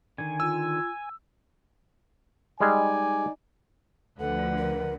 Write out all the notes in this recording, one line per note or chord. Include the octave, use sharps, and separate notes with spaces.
D3 D#3 G#5
F4 E6
G3 G#3 D#4 G#4 D5 G#5
D2 D3 F3 A4 B4 F#5
A#4